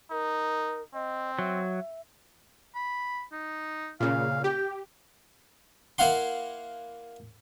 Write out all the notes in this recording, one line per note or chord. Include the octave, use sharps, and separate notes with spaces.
D#4 A#4
C4 D#5
F#3 E5
B5
D#4
A#2 C#3 F5
G4 G5
A#3 E4 F5 F#5 C6